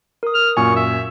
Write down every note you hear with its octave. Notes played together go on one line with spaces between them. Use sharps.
A#4 D#6
F6
F#2 A#2 G#5 C#6
E5